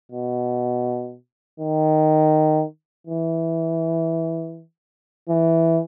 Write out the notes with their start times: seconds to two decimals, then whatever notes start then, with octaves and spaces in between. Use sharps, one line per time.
0.12 B2
1.60 D#3
3.07 E3
5.29 E3